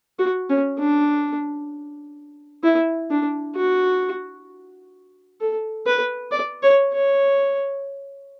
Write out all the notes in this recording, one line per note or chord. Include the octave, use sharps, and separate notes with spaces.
F#4
C#4
D4
E4
D4
F#4
A4
B4
D5
C#5
C#5